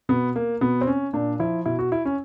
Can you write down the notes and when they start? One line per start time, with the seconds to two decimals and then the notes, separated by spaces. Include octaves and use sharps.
0.09 B2 B3
0.36 A#3
0.61 B2 B3
0.81 C4
0.87 C#4
1.13 A#2 D4
1.39 F3 E4
1.66 B2 E4
1.79 F#4
1.92 E4
2.05 C#4